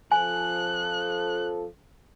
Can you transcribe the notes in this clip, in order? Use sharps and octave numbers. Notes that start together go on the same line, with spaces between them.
F2 F3 A4 G#5 F#6